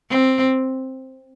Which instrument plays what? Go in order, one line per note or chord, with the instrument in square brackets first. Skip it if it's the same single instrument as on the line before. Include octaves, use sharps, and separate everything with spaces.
[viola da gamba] C4